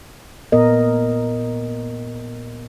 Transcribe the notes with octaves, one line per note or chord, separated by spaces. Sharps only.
A#2 B3 A#4 D#5